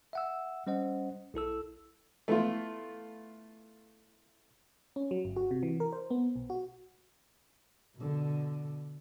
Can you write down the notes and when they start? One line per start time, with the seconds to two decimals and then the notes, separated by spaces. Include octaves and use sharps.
0.13 E5 F#5 E6
0.67 G3 C#4 C5 D#5 F#5
1.34 B1 E4 A4 E6
2.28 A3 B3 E4 F4
4.96 C#4
5.11 F#3
5.25 G1
5.36 F#4
5.51 C3
5.63 E3
5.80 A#4
5.93 C5
6.10 B3
6.36 B1
6.50 F#4
7.96 B2 D3